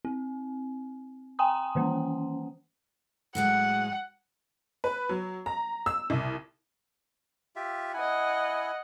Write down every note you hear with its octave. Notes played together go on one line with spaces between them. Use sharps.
C4
G5 G#5 A#5 C6 D#6
D#3 E3 A#3 C#4
A2 F#3 G#3 F#5
B4
F#3
A#5
E6
C2
F4 G4 E5
E4 D#5 F#5 G#5